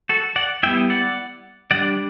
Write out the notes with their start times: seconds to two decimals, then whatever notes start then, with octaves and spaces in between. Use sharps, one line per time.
0.09 F#4 A4
0.36 D5 F#5
0.63 G3 B3 E4 E5 G5
0.90 D5 F#5
1.71 G3 D4 D5 F#5